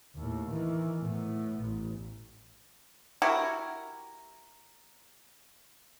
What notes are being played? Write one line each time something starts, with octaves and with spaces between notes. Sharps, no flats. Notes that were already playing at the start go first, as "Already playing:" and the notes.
D#2 A2
D#3 E3
A2 B3
A1
E4 F#4 G4 A#4